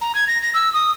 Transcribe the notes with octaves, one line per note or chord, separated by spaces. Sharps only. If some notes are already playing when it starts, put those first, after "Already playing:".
A#5
G#6
A#6
A#6
E6
D#6